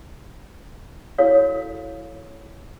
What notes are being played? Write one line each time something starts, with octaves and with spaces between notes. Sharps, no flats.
E4 F#4 A4 A#4 C#5 F5